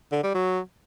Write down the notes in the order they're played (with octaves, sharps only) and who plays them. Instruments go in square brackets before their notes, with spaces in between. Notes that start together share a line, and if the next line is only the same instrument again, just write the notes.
[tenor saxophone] D3
G3
F#3